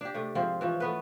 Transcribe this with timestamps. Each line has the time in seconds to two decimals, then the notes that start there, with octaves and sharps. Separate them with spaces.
0.01 D4 G4
0.14 C3 A3
0.35 G#2 F3 C4
0.61 E3 F3 C#4
0.80 A3 B3 B4